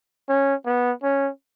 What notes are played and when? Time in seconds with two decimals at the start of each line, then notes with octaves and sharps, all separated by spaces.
0.29 C#4
0.65 B3
1.03 C#4